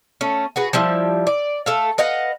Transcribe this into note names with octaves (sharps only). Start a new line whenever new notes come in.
A3 C#4
F#4 G#4 B4
F3 G3 E4
D5
A3 A4 F5
B4 D#5 F5 F#5